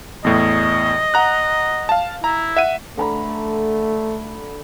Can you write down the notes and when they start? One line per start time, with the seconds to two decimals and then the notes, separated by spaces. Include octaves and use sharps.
0.25 E2 A2 D#5
1.14 F#5 A#5 F#6
1.89 F5 A5
2.24 E4 A#5
2.57 E5 F#5 D#7
2.97 D3 A3 A#5 B5